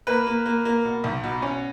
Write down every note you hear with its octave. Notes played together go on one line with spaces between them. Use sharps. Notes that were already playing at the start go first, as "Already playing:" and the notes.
A#3 B4
A#3
A#3
A#3
B2
B1
B2
C#4